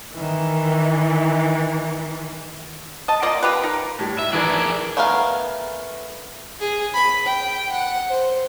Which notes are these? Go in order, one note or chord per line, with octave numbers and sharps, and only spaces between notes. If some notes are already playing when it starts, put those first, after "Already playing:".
D#3 E3
D#5 A5
A#3 F4 D5 D#5
F4 G4 B4
D#4 A#4
A2 G3
E5
D#3 E3 D4 G#4 A#4 D5
A3 B3 G#4 A#4 F5
G#4
B5
G5
F#5
C5